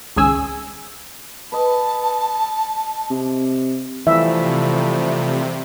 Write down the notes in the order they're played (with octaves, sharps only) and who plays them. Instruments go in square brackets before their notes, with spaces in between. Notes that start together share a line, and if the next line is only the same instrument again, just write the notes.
[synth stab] G#1 C#2 C#4 G#4 G#5 E6
[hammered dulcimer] B4 D#5 [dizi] A5
[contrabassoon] C3
[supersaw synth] C3 [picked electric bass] E3 [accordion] F3 G3 A3 [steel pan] E5